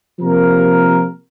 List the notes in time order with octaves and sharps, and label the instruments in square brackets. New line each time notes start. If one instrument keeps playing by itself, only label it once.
[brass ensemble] C3 F3 A#3 G4 A#4